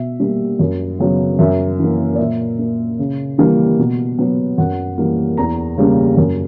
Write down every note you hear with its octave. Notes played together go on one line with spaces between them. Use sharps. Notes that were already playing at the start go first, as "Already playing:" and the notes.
Already playing: B2 E5
G3 A#3
F#2
C#3 F#3 B3
F#2 E5
E3 A#3
D5
A#2 E5
A#3
C#3
E3 G3 A#3
B2
F#3 B3
F#2 F#5
E3 G3 A#3
E2 A#5
C#3 G3 A#3
F#2